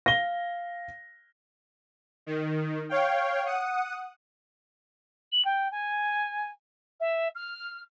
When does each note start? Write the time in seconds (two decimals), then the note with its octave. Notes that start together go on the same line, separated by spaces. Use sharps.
0.06 F5 A#6 G7
2.26 D#3
2.89 C#5 F5 G5
3.46 F#5 D#6
5.32 F#7
5.45 G5
5.71 G#5
7.00 E5
7.35 F6